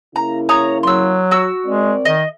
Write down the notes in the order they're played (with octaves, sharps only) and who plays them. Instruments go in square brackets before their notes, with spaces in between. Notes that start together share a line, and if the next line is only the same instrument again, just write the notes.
[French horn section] C#3 A#3 E4 [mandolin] A#5
[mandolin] C#5 A#5 D#6
[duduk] F#3 [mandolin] C6 E6
[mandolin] F#4 E6
[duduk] G#3 [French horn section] C4 A#4 D5
[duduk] D#3 [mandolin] D#5